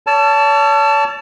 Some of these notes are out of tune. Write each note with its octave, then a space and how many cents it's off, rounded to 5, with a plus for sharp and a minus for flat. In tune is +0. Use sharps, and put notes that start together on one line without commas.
C#5 +40 A5 +0 E6 +45